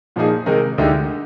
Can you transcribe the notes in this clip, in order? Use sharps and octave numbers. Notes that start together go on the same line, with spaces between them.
A#2 F3 A#3 D#4 G#4
C3 D#3 G#3 D#4 A#4
D2 D3 G#3 D#4 G4